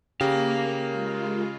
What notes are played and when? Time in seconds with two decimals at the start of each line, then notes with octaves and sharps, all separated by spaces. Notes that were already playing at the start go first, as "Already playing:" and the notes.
0.21 C#3 A#3 G4 A#4 F5
0.90 G#3 F4